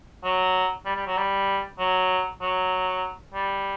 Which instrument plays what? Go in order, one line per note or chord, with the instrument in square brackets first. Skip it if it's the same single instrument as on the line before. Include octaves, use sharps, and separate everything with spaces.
[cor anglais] F#3
G3
G3
F#3
G3
F#3
F#3
G3